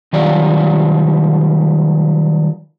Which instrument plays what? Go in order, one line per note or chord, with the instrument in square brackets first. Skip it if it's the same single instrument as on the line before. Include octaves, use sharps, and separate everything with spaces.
[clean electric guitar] D#3 F#3 G3 F4 C#5 D5